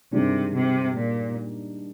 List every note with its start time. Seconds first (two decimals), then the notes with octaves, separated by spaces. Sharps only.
0.12 G2 C3 D#3 G#3 D4
0.54 C3
0.96 A#2